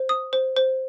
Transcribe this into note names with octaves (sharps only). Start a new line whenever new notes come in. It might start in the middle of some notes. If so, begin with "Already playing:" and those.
Already playing: C5
D#6
C5
C5